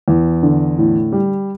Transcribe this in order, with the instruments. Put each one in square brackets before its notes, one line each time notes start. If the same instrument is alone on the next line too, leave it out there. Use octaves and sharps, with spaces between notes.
[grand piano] E2
D3
A2
G3